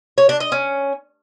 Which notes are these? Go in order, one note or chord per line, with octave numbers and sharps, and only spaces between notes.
C#5
D4
D#5
C#4